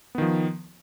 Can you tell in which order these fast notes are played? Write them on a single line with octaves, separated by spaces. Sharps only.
B3 D#3 F3